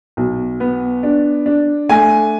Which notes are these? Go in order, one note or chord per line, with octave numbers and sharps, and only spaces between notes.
B1
B3
D4
D4
A3 G#5